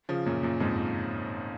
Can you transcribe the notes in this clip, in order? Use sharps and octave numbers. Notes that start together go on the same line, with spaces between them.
C#3 F3
F#2 A#2
F#2 A#2
F2 G#2